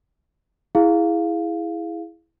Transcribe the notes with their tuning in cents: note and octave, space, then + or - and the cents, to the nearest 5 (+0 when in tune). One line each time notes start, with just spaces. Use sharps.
E4 +0 G#4 +0 F5 +0